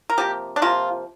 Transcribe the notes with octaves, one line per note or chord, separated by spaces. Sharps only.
A#4
C3 F3 A#3 G4
D4
C3 F3 A#3 F4